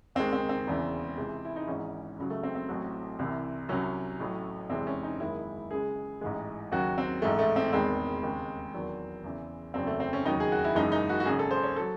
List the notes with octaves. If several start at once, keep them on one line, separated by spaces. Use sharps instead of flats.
D#2 D#3 G#3 C4
C4
C4
E1 E2 C#3 E3
C#2 C3 E3 G#3
E4
D#4
G#1 G#2 E3 G#3 C#4
C#2 C#3 F#3
A3
C4
C4
A1 A2 F#3
C2 C3 E3
C2 C3 F#3 C#4
A1 A2 F#3
E1 E2 C3 E3 G#3 C4
C#4
D#4
F#1 F#2 D#3 G#3 E4
C#2 C#3 G#3 G#4
A1 G#2 E3 G#3
D#2 C#3 F#3 F#4
C4
A1 G#2 E3 G#3 A3
A3
C4
E1 E2 D#3 G#3 C4
D#2 C#3 G#3
E2 D#3 F#3
E2 C#3 E3
F#1 E2 C#3 F#3 C4
A3
C4
C#4
E1 D#2 C#3 F#3 D#4
G#4
F#4
E4
F#1 F#2 C#3 E3 G#3 D#4
D#4
F#4
F#4
G#1 F#2 C#3 G#4
A4
C5
C#5
F#3 A4